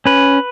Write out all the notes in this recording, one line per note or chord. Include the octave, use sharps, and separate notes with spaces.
C#4 B4